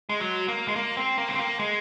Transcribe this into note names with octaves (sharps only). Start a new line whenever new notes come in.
G#3
F#3
A#3
G#3
A#3
C4
A#3
C4
A#3
G#3